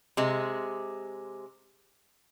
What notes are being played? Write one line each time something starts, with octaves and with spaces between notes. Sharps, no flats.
C3 G#3